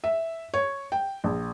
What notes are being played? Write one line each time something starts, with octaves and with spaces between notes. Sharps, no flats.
E5
C#5
G5
A#1